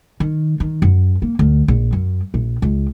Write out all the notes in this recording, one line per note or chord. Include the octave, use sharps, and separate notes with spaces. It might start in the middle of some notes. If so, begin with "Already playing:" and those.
D#3
D#3
F#2
A#3
D2
A#1
F#2
A#1
C#2